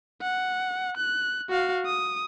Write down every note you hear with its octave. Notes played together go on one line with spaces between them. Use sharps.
F#5
F#6
F#4 F5
D#6